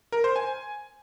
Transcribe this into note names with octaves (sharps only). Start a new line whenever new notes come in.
A#4
C5
G#5